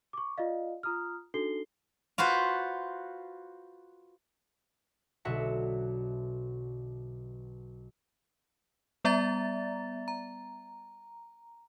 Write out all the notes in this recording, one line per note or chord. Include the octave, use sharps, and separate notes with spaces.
C#6 D6
F4 D5 D#5 F5
F4 A#5 D#6 F6
D4 D#4 F#4 A4 C7 G7
F4 F#4 B4 C5
B1 B2 D3 F#4 E5 F#5
G3 B3 D5 E5 A#5 A6
A#5